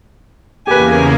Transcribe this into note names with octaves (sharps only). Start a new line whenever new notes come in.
E2 C#3 A#3 G4 B4 G#5